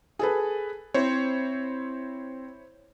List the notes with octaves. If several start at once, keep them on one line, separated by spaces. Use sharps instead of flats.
G#4 A4 B4
C4 E4 C5 C#5